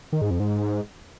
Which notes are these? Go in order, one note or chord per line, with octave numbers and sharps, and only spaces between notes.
D#3
G#2
F2
G#2